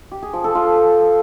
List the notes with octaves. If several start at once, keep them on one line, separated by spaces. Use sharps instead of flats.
G4
G#4
F3
A4
F4